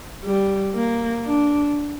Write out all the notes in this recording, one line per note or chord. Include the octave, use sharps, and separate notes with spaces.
G3
A#3
D4